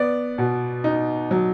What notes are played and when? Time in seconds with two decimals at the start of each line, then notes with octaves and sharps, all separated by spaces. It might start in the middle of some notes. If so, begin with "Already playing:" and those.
Already playing: B3 D5
0.38 B2
0.84 D#4
1.31 F#3